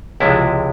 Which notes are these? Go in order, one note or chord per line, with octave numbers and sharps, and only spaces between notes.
C#2 C3 F3 G#3 E4